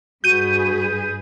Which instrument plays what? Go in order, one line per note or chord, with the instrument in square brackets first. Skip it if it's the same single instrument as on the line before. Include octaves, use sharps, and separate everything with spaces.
[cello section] G2 G#4 B4 [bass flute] F#4 [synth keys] G6 D#7